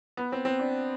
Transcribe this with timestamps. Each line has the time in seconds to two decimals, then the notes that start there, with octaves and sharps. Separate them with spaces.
0.17 B3
0.32 C4
0.45 C4
0.59 D4